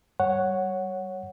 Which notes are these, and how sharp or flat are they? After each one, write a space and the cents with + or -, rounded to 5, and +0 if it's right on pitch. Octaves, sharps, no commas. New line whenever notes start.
G3 -10 C#5 +0 F#5 +0